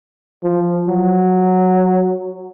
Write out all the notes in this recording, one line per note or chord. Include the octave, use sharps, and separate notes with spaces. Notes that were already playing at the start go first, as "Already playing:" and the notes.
F3
F#3